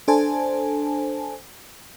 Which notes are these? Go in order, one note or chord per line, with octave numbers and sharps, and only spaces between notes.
D4 A4 C5 G#5 A5